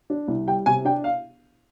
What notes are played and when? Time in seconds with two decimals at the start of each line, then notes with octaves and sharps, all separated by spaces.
0.10 D4
0.28 C2
0.47 G3 G5
0.66 C3 G#5
0.85 D4 G5
1.04 F5